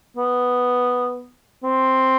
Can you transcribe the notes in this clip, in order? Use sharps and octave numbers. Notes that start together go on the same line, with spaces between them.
B3
C4